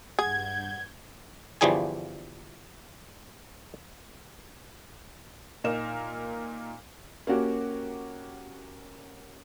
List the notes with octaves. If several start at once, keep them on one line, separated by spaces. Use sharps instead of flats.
G2 G#4 F#5 G6 G#6
G1 E3 F3 G3 G#4 G#5
A#2 D#4 A#4 E7
A#3 C#4 F#4 G4